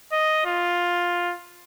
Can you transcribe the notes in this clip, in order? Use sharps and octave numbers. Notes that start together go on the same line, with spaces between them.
D#5
F4